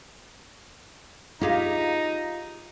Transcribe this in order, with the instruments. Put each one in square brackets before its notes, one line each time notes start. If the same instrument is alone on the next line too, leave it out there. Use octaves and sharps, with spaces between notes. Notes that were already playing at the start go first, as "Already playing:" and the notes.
[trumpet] D#4 [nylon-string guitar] F4 [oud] G4 G#4 F5